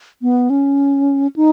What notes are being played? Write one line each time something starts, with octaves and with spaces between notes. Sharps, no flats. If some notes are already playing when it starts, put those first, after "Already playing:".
B3
C#4
D#4